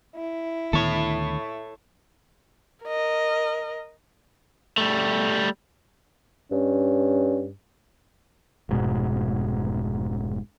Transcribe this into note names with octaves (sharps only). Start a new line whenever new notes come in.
E4
D2 D#3 B3 A4 C#5
A#4 D#5
G3 A3
G2 C#4
F1 G#2 B2